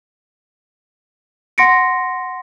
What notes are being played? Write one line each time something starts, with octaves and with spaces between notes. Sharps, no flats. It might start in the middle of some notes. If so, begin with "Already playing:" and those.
F#5 C6 A#6 C#7 D7